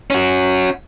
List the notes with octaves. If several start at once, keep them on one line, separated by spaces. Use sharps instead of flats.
C#4 F#4